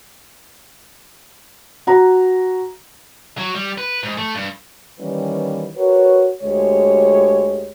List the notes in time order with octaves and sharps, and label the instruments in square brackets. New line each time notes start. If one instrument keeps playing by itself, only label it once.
[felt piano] F#4 A#5
[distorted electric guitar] F#3
G3
B4
G#2
A3
G2
[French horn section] D#3 E3 G3 A#3 C#4 B4
F#4 A#4 B4 C#5
D2 G#3 G4 G#4 C#5